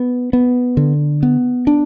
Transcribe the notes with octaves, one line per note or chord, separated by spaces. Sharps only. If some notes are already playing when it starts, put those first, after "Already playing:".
Already playing: B3
B3
D3
B3
D4